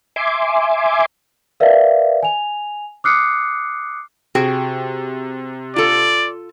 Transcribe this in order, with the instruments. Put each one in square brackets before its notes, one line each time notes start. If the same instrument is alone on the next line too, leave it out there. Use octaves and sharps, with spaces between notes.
[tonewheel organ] E5 G#5 C6 D6
[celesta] A#4 B4 D5 E5 F5
G#5 F7
D6 D#6 F6 F#6 C7 C#7
[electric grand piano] C3 [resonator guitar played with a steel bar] F#4 G#4 G5
[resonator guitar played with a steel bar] F4 A4 [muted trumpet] D5